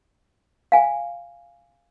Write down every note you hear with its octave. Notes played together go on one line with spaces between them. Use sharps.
F5 G#5